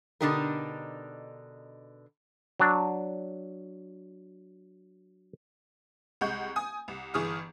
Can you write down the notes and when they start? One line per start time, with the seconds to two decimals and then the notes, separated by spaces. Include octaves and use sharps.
0.21 B2 D3 D4 D#4 G4 A#4
2.60 F#3 D4
6.21 C2 G#3 F#5 C#6 G6
6.56 G#5 D#6
6.88 C2
7.14 G1 E3 G#4 C#6 D#6 F6